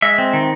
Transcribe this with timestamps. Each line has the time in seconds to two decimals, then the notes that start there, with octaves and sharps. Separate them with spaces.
0.02 G#3 E5
0.18 C4
0.33 D#3